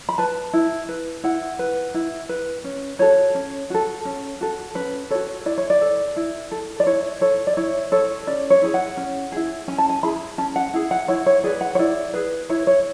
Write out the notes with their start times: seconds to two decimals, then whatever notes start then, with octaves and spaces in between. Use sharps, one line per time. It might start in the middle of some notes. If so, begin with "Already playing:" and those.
0.09 B5
0.18 B4 A5
0.53 E4
0.89 B4
1.24 E4 F#5
1.59 B4
1.94 E4
2.29 B4
2.64 C#4
2.99 F#4 A4 C#5
3.35 C#4
3.70 F#4 A4
4.05 C#4
4.41 F#4 A4
4.75 C#4 B4
5.10 F#4 A4 C#5
5.46 E4 D5
5.58 C#5
5.70 D5
5.81 A4
6.16 E4
6.51 A4
6.80 D5
6.86 E4 C#5
7.21 A4 C#5
7.47 D5
7.57 E4 C#5
7.92 A4 C#5
8.27 C#4 D5
8.50 C#5
8.62 E4 G#4
8.74 F#5
8.97 C#4
9.32 E4 G#4
9.68 C#4 G#5
9.78 A5
9.89 G#5
10.03 E4 G#4 B5
10.38 C#4 A5
10.56 F#5
10.74 E4 G#4
10.91 F#5
11.08 E4 C#5
11.26 C#5
11.44 G#4 B4 D5
11.61 F#5
11.75 C#5
11.79 E4 D5
12.14 G#4 B4
12.49 E4 C#5
12.67 C#5